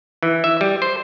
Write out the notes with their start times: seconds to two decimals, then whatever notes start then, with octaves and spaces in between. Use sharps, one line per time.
0.23 E3
0.44 E5
0.61 G3
0.82 C5